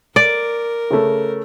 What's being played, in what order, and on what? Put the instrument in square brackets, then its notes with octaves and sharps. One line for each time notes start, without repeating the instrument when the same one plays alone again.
[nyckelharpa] A#4 [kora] D5
[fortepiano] C#3 A3